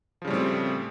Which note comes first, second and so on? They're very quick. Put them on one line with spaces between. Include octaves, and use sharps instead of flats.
F3 C#3 G3 A2 C4